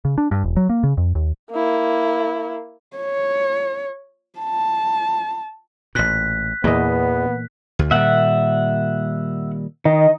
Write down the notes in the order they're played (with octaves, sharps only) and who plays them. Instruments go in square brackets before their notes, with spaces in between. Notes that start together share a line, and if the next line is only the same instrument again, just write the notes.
[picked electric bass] C#3
D4
G2
E1
F#3
A#3
C#3
F2
D#2
[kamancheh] A#3 E4
[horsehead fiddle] C#5
A5
[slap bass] A1 A#2 [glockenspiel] F#6 B6
[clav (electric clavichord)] E2 D#5 [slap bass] A#2 E3 A#3 [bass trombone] B3
[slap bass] D2
[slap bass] A#2 D#3 G3 [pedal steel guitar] E5 F#5
[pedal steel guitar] D#3 [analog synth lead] D#5